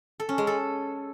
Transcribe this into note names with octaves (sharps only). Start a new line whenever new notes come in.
A4
C#4
G#3
A4